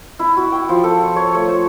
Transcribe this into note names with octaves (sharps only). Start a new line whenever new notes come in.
E4
F#4
G5
F3
A4
C#6
C#5
A3
C5